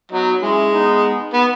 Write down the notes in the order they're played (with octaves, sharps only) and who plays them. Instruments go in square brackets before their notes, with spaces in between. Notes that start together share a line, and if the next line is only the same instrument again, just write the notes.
[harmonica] F#3 [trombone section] B3 D#4
[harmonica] G#3 [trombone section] C#4 E4
[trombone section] B3 D#4
[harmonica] B3